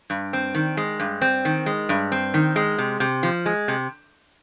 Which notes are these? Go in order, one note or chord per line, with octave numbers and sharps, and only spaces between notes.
G2
C4
D#3
G#3
G2
C4
D#3
G#3
G2
C4
D#3
G#3
C3
C3
F3
G#3
C3